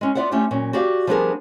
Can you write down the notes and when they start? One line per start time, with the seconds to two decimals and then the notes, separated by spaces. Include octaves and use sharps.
0.01 G#3 C#4
0.15 B3 F4 D5 E5 F#5
0.31 A3 C#4 D4 F4 G4
0.51 A#2 F#3 C#4
0.73 F#4 G4 D5 F5
1.07 F3 G3 B3 D4 G#4 A#4